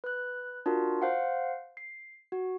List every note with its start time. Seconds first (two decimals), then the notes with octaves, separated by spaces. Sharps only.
0.04 B4 F#6
0.66 D4 F4 F#4 A#4
1.02 C5 F5 F#5
1.77 C7
2.32 F#4